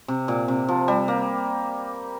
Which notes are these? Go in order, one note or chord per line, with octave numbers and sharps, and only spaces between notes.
C3
A#2
C3
F3
G3
A#3